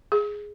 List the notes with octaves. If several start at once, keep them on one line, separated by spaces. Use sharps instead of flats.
G#4